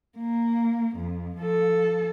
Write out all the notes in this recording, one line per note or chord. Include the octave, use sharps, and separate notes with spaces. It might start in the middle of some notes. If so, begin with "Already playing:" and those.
A#3
F2
F3 A4